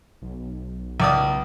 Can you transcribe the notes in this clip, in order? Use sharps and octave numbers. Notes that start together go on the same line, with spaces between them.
B1
C#2 D5 D#6